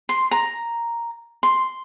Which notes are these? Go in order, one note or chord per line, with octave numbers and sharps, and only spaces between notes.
C6
A#5
C6